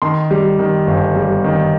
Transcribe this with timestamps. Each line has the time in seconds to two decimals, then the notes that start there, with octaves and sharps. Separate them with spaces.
0.02 D#3 C6
0.31 G3
0.59 D#3
0.87 G1
1.16 G3
1.44 D#3